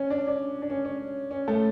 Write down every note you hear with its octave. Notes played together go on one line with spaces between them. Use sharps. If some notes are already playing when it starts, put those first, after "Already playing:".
Already playing: C#4
D4
D4
D4
C#4
C#4
C#4
A3 A4